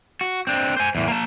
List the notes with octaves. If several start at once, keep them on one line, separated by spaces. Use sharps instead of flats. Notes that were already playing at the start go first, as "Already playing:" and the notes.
F#4
C4 D4
C5 G#5
E2 A2
A#3 A5